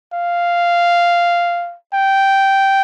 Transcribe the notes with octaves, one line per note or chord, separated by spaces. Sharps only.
F5
G5